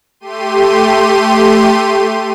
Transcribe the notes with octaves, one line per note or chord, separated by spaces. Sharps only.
A3 G4 C6 D#7